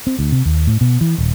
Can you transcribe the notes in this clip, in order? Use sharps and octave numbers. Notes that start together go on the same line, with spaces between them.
C4
D2
C3
D#2
A2
B2
E3
D#1